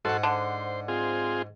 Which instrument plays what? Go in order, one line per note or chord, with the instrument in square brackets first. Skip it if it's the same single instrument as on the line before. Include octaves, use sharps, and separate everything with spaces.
[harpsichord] G#2 F#5 [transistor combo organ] F#4 A4 C6
[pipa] D3 [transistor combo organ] C5
[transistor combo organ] C4 F4 G#4